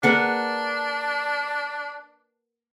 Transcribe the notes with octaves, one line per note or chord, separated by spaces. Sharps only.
A#3 D4 G#4 A#4 B4 F#5